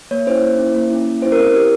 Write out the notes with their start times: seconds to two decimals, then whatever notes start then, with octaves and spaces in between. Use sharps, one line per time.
0.11 A#3 C#5
0.27 C#4 E4 C5
0.42 A#3
0.59 C#4 E4
0.75 A#3
0.91 C#4 E4
1.06 A#3
1.22 C#4 E4 C5
1.32 A#4
1.38 C4
1.52 E4 G4 A#4